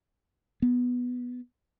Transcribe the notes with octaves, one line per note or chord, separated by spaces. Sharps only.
B3